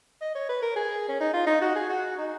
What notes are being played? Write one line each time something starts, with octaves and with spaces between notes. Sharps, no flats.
D#5
C#5
B4
A#4
G#4
C#4
D#4
F4
D#4
F#4
G#4
F#4
D#4